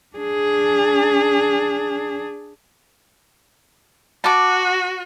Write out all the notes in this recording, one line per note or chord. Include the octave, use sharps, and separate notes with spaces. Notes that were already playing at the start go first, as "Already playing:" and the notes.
D4 G#4
F#4 A5 D6